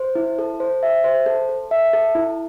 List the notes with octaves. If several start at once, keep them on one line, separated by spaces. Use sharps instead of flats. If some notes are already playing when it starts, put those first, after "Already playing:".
Already playing: C5
E4
A4
C5
E5
C5
A4
A4
E5
A4
E4